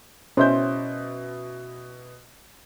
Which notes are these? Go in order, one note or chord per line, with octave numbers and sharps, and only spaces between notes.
B2 C#4 E4 C5 G6